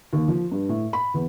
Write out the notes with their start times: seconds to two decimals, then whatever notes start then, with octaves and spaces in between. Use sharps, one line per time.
0.13 D#2
0.28 F3
0.52 G2
0.69 A2
0.93 B5
1.14 E2